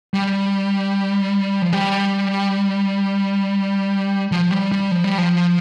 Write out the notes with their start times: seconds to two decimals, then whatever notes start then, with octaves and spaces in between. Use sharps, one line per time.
0.14 G3
1.62 F3
1.73 G3
4.32 F3
4.52 G3
4.72 G3
4.91 F3
5.04 G3
5.18 F3